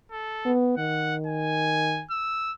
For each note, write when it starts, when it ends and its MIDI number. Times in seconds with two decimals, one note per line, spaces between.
0.12 0.54 69
0.46 0.76 59
0.78 2.03 51
0.78 1.16 78
1.27 2.05 80
2.11 2.54 88